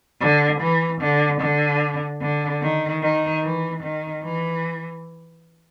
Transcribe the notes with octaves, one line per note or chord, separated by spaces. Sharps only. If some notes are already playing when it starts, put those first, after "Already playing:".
D3
E3
D3
D3
D3
D#3
D#3
E3
D#3
E3